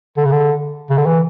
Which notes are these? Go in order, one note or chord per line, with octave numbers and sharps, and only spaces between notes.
D3
C#3
D3
C#3
D3
E3